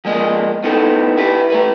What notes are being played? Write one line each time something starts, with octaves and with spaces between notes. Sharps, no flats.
F3 G#3 A#3 D#5
A2 B3 C4 D#4 A4
E4 G4 B4
A3 E4 B4